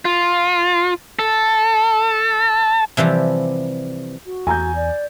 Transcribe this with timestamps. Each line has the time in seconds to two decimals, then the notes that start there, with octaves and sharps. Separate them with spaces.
0.05 F4
1.19 A4
2.97 C3 E3 F3 G3
4.26 F#4
4.47 E2 G#5 A#5 G6
4.75 D5